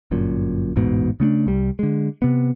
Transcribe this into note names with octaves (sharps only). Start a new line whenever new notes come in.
G1 F#2 A#2
A1 E2 G#2 B2
C#3 A3 C#4 D4
C2 G3
D3 G#3
C3 B3